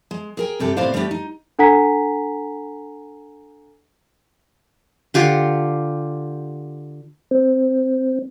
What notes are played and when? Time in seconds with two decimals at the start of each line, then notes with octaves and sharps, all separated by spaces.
0.11 G#3
0.37 G#4 A#4 G5
0.60 G2 C3 G4 A4
0.77 A2 C3 B3 C5 D5 F5
0.94 G3 A3 B3 D4 F4 G4
1.11 D#4
1.59 D4 A4 F#5 G#5 A#5 B6
5.14 D3 F4 G4 C6
7.31 C4